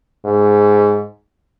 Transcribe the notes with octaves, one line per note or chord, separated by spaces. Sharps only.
G#2